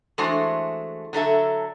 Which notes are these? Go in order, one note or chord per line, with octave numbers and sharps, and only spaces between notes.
E3 G#3 A3 D4 F#4 C5
D3 F#3 A4 E5